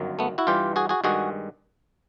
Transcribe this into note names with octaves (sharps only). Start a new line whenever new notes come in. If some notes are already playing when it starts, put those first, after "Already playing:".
Already playing: G1 F#2 D#3 F#3
A3 B3
E4 F#4
G2 E3 G3 F4 G4
F#4 G#4
F#4 G#4
G2 D#3 G#3 F#4 G#4